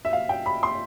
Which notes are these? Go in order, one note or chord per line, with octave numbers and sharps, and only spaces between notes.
E5
F5
G5
B5
C6